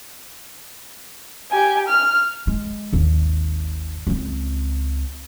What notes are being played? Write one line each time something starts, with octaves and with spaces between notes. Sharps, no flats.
G4 G#5
F6
G#3
G#1 D#2
C#2 C4